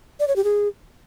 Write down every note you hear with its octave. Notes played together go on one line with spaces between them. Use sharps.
D5
C#5
G4
G#4